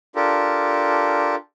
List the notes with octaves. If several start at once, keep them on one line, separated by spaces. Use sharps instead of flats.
D4 F4 G4 A4 A#4